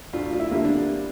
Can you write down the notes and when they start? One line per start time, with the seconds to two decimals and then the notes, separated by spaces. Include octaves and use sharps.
0.13 D2 F4
0.33 F4
0.40 E4
0.51 D3 G3 A#3
0.65 D4